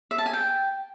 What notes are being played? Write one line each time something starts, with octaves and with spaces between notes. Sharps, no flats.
E5
A5
G#5
G5